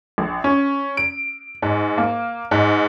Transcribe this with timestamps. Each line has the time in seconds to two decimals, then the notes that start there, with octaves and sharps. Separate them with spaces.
0.18 A#1
0.44 C#4
0.97 D7
1.62 G#2
1.98 A#3
2.51 G#2